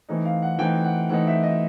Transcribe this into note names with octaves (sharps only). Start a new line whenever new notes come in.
E3 A3 C4 D#4
F5
F#5
E3 A3 C4 D#4 G5
F#5
E3 A3 C4 D#4 F#5
E5
D#5